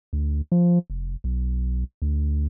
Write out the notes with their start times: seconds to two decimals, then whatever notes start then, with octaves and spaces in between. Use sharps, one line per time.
0.13 D2
0.52 F3
0.90 F1
1.24 B1
2.02 D2